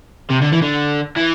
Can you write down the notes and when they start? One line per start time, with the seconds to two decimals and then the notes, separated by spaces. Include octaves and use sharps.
0.30 C3
0.41 D3
0.52 E3
0.62 D3
1.17 E3